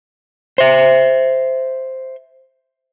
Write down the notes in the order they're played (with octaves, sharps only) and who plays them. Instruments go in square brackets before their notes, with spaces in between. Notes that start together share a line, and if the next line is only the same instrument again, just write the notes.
[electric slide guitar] C5 E5